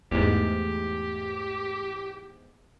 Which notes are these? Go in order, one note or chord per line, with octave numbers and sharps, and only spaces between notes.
E2 G#2 A3 G4